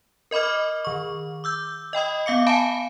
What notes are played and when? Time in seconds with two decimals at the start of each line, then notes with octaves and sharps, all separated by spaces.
0.31 A#4 D#5 B5 D6 F6
0.85 D#3 C#6
1.44 D6 E6 G6
1.93 D#5 G5 B5 D#6
2.26 B3 F5 D6 C#7
2.46 F5 G#5 A5 B5 D7